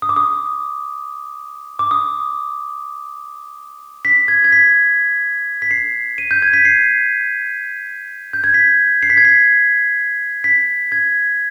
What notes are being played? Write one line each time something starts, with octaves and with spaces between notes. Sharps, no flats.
D#6
D6
D#6
D6
D#6
B6
G#6
G#6
B6
B6
C7
D#7
G6
G#6
B6
C7
G6
G#6
B6
C7
B6
G#6
B6
B6
G#6